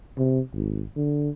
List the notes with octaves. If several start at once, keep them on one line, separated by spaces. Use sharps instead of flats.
C3
G#1
D3